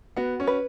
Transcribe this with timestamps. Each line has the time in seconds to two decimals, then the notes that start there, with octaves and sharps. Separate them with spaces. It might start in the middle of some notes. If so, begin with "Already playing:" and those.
0.17 B3 F#4
0.40 C#4
0.47 B4